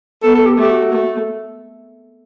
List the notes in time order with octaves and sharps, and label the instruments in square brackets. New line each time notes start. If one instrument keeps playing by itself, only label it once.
[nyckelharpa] B3 [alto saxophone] A4
[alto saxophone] A4
G4
[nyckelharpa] A3 [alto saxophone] G4
[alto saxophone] F#4
[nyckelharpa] A3